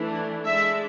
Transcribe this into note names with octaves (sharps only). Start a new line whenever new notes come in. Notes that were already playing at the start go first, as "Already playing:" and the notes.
Already playing: E3 A3 D4
G#3 D4 E5